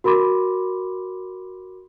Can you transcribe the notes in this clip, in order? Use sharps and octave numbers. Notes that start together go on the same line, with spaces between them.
F#4 A#4 B5 C6 D6